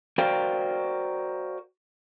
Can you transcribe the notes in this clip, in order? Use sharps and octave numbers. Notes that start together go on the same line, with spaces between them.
F#4 A#4 C5 D5 F5 G5